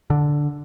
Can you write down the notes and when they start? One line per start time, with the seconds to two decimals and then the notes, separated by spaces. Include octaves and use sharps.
0.10 D3